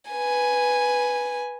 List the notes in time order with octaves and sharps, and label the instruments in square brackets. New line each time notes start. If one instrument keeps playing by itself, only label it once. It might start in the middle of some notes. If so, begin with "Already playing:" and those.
[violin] B4 G#5